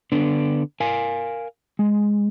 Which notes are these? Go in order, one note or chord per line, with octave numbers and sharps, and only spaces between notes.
D3 B3 D4
A#4 F5 G#5
G#3